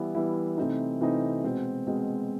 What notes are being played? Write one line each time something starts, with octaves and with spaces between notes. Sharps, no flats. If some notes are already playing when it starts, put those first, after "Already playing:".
Already playing: E3 G3 B3 E4
E3 G3 B3 E4
C3 E3 A3 C4 D#4
C3 E3 A3 C4 D#4
B2 G#3 C4
B2 G#3 C4